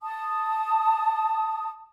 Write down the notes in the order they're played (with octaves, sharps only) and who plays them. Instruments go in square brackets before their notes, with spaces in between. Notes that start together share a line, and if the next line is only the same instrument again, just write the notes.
[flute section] A5 D#6